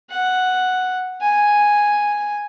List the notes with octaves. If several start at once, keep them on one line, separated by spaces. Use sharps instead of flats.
F#5
G#5